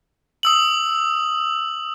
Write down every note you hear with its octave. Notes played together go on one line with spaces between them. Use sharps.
D#6 E6 F#7